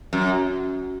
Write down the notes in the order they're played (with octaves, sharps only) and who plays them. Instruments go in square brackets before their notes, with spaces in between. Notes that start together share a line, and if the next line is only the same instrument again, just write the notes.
[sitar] F#2